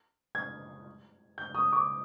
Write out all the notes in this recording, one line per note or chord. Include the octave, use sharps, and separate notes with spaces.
G#6
G6
D#6
D6